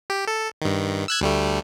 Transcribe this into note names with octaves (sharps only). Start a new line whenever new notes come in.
G4
A4
G2 D#3
E6 F#6 G#6
D2 G3 A3